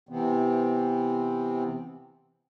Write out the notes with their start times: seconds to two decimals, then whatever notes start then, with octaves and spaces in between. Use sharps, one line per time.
0.09 C3 E3 B3 C4